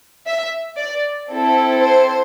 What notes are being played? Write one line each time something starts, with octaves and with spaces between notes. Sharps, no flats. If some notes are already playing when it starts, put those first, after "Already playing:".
E5
D5
C4 E4 A4
C5